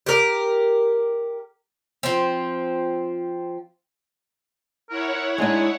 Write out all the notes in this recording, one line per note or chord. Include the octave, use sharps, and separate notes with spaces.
G4 A#4
F3 C4
E4 A#4 C#5 F#5
G#3 D4 D#4 G#5